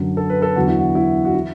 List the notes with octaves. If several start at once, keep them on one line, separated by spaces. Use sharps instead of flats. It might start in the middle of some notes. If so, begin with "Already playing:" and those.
Already playing: F#2 D3 F#3
A4
B4
A4
E2 D3 F#3 F#4
E4
F#4
E4
F#4
E3 E4